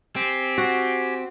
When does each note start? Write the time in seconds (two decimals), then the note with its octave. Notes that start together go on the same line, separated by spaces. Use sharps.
0.16 C4 G4 G5 G#5
0.58 F#4